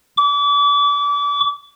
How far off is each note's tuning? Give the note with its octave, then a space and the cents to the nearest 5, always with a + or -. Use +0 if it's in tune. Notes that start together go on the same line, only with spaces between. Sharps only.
D6 -35